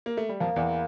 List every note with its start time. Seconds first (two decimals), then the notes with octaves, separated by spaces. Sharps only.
0.06 A#3
0.17 A3
0.29 G3
0.40 F2 F3 A#3
0.56 E2 E3